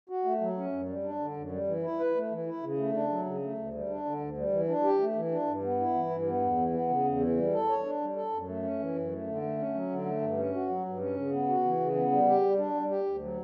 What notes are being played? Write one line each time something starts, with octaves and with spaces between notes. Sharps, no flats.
F#4
A3
F#3
C#4
F#2
G3
D4
D3
F#2
G3
E3
E4
B4
A3
E3
E4
C#3
A3
D4
F#3
C#3
A3
D2
G3
D4
D3
D2
G3
E3
D4
G4
A3
E3
D4
G2
B3
E4
E3
G2
B3
E2
E3
B3
C#3
E2
E3
G3
A4
C#5
D4
G3
A4
F#2
A3
C#4
E3
F#2
A3
D3
A3
C#4
F#3
D3
A3
G2
C#4
F#4
F#3
G2
C#4
C#3
B3
F#4
E3
C#3
B3
G3
G4
G3
D4
G3
G4
D2
F#3